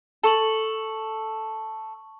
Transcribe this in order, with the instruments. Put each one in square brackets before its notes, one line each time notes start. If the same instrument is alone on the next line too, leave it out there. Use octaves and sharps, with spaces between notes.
[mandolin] A4 [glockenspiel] A5 C#6 F#7